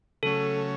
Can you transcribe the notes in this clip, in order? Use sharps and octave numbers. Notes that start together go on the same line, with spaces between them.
C#3 F#3 A3 C#4 A4